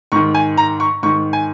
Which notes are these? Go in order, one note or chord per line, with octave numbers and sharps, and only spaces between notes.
G#2 D#3 C#6
G#5
A#5
C#6
G#2 D#3 C#6
G#5